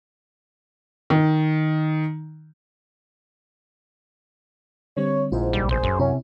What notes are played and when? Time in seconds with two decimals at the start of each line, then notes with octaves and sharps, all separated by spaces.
1.10 D#3
4.97 D3 G3 C4 C#5
5.32 A#1 G#2 E4 F4 C5
5.53 G1 C2 G3
5.69 B1 G#4 C5
5.83 F#2
5.99 C3 C#4 E4